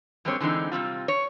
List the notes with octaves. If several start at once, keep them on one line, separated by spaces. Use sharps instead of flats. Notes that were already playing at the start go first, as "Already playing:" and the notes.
G2 G3 G#3 A#3 C4 C#5
D3 E3 G#3 C4 D#4
C3 G3 C4 F4
C#5